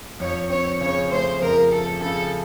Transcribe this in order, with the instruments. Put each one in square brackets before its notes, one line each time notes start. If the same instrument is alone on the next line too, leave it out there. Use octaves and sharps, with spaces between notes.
[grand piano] F2 [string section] C#5
[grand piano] C4 [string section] C#5
[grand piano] C#3 [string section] C#5
[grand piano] A3 [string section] C5
[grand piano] F2 [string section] A#4
[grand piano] C4 [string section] A4
[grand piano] C#3 [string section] A4